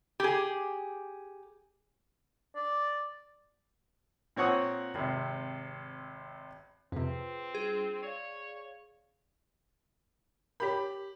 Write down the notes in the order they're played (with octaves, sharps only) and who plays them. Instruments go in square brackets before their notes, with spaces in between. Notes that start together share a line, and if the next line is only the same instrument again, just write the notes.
[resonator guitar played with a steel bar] G4 G#4
[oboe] D5
[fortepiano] A#2 C4 C#5 F#5 C#6 D#6
G#1 C3
[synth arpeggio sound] F2 C3 [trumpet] C4 [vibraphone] F4 G#4 B4
[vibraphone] G3 D4 F4 [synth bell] G#4
[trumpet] C#5 [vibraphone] D5 F5
[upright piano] G4 B5 [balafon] A#4 C#5